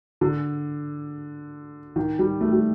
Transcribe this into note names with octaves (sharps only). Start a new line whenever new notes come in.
D3
D#3
G3
A3
G3